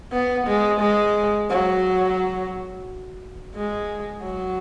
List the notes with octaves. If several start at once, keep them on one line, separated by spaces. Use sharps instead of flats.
B3
G#3
G#3
F#3
G#3
F#3